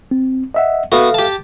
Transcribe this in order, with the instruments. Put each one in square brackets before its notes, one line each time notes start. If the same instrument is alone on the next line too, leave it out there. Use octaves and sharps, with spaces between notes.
[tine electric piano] C4
D#5 E5 F#5
[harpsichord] B3 F#4 [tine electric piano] A4 E5 F5
[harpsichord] G4 A5